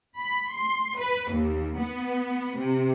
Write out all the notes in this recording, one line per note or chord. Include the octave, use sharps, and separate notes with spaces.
B5
C6
B4
D#2
B3
C3